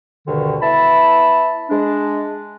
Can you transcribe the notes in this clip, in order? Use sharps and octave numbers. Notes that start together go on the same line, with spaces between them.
D2 G2 B2 D3 D#3
B3 E4 A5 B5
G#3 D4